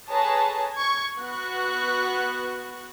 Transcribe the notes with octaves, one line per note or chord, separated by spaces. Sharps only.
G#4 A4 B4 C#5 A5 A#5
C#6 G#6
B3 F#4 C#6 F#6